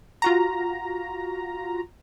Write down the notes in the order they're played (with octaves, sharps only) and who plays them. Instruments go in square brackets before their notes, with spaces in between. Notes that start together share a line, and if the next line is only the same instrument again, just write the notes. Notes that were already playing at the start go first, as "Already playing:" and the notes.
[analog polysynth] F4 F#4 A#5